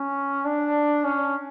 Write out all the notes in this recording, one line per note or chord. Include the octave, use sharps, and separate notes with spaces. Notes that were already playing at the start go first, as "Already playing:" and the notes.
Already playing: C#4
D4
C#4